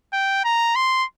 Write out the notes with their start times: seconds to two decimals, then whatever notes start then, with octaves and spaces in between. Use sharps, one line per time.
0.13 G5
0.45 A#5
0.76 C6